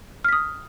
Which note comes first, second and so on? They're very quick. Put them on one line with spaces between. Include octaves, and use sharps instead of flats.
F6 B6 D#6